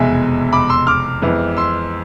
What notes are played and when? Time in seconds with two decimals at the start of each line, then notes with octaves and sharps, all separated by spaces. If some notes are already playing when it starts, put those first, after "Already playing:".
Already playing: F1 E2 B2 G#3 E5 G#5
0.52 B5 D6
0.69 C6 E6
0.87 D6 F6
1.22 F2 E3 G#3 B3 E4
1.57 C6 E6